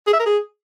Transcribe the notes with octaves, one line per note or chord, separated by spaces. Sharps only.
G#4
E5
A#4
G#4